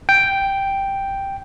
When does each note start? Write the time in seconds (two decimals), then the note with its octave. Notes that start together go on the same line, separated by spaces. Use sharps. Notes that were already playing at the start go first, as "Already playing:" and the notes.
0.09 G5